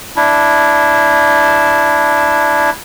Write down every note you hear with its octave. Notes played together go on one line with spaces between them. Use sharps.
D4 E4